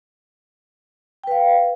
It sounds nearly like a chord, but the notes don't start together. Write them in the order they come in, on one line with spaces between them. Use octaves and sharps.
G5 B4 F5